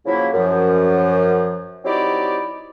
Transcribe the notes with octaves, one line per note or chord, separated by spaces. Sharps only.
C#3 F3 F#3 A#3 E4
F#2 F3
F#3 C4 D#4 E4 G4 D5